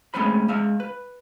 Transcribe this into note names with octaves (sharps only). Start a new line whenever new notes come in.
G#3 A3 C4 C#4 C5 B5
G#3 E5 F5
B4